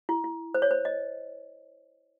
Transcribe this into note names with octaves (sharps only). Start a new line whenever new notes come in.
E4
E4
C5
C#5
C5
D#5